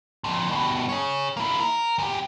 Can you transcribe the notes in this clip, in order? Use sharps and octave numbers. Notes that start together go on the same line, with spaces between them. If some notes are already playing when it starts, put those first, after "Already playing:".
F2 A#2
G2 B2
G#4 C#5
A#3 E4
A#4
E2 G4